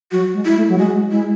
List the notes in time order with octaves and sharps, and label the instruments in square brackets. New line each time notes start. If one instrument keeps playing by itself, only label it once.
[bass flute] F#3 [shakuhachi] F#4
[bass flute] G#3
[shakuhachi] E4
[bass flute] A3
F#3
[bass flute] G#3 [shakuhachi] F#4
[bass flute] G#3 [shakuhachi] E4